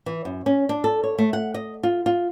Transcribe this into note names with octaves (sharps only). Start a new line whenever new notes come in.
E3
F#2
C#4
D4
A4
C#5
A3
F#5
D#5
F4
F4